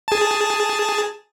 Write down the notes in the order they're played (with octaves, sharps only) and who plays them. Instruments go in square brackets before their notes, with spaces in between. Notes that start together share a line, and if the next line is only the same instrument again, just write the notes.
[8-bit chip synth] G#4 A5